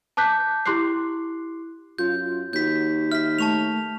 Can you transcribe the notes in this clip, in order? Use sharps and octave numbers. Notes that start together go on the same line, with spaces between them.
A5 D6 F#6 G6 B6
E4 G4 C6 D6 F#6 C7
F#2 F4 G6
D#2 F#4 G6 B6
E5 F6 B6
A3 A5 C#6 F7